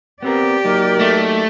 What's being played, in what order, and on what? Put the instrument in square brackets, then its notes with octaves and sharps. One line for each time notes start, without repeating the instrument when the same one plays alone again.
[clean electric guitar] B3 C4 A#4 [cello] G4 D5
[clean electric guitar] F#3 A#3 D#4 [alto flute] A#4
[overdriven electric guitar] A3